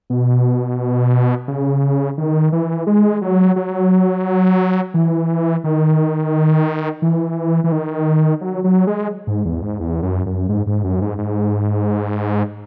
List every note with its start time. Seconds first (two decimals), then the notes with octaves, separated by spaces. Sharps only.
0.10 B2
1.48 C#3
2.18 D#3
2.52 E3
2.87 G#3
3.22 F#3
3.56 F#3
4.94 E3
5.64 D#3
7.02 E3
7.64 E3
7.72 D#3
8.41 F#3
8.64 F#3
8.87 G#3
9.27 G#2
9.45 E2
9.62 G#2
9.80 E2
10.02 F#2
10.26 F#2
10.49 G#2
10.67 G#2
10.84 F#2
11.01 G#2
11.18 G#2